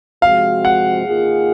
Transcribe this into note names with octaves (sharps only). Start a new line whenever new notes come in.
C3 F3 G#3 C4 F#4 F5
F#5
D#3 A#3 F4 G#4